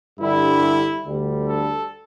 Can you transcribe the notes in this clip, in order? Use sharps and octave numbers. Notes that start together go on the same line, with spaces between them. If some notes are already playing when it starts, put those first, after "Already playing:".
G2 D3 G3 E4
D2 D3 G3
A4